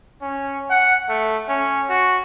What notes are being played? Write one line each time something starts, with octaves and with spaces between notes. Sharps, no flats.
C#4
F#5
A3
C#4
F#4